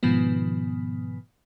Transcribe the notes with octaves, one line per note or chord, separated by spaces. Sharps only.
G#2 B2 D#3 F3 B3